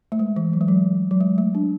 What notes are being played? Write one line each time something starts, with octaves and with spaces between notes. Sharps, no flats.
A3
G#3
E3
F#3
G#3
F#3
F#3
G#3
A3
D4